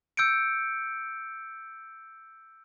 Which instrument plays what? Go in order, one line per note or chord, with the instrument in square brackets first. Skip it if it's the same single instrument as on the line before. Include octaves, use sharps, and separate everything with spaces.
[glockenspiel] E6 G6 C#7 D7